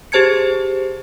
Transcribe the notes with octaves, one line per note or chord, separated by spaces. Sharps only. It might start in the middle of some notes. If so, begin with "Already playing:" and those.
G4 G#4 C5 A5 G#6 C#7